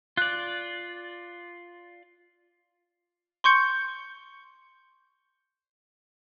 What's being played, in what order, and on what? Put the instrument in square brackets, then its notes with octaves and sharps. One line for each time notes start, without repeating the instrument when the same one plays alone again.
[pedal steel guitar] F4 D5 [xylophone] F#6
[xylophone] C6 C#6 G6 C#7